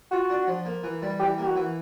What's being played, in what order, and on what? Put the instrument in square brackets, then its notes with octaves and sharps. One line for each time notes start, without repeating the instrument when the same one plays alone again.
[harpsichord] F4 [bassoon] F#4
[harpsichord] D4
F3
A#3
E3
G3
[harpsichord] E3 [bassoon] G4
[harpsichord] A#3 [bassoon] G4
[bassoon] F#4
[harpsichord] E3